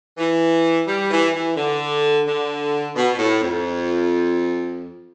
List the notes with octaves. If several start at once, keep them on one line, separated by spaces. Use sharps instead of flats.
E3
G3
E3
E3
D3
D3
B2
B2
A2
F2